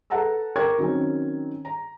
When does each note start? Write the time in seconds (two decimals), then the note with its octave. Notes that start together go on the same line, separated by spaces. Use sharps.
0.10 A4 B4 F#5 A5 A#5 E6
0.56 A#4 G5 A#5 C#6 D6 G#6
0.78 D#3 F#3 C4 C#4
1.65 A#5